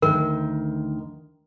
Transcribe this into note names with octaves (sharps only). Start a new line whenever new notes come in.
D2 D#3 A#4